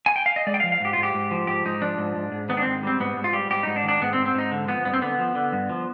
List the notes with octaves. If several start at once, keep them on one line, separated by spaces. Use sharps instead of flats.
G#5
G5
F5
D#5
G#3 D5
G5
F5
F3
F5
G#2 G4
G#2 F4
G4
G#2
F3
G#2 G4
G#2 D#4
F3 D4
G#2
G#2
G#2
D#3 B3
D4
G#2 C4
G3 C4
G#2 B3
G#2
F4
G3 G4
G#2 G4
G#2 D#4
D4
D#3
D4
G#2 B3
C4
G#2
C4
G#2 D#4
D3
F3 B3
G2 B3
C4
D3 B3
F3
D3
G2
F3